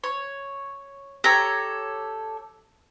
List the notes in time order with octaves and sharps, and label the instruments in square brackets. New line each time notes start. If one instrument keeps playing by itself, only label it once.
[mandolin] C#5
[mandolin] G4 A4 C#5 [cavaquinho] A#5